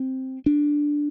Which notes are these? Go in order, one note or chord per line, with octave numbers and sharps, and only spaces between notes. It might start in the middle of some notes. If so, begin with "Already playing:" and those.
Already playing: C4
D4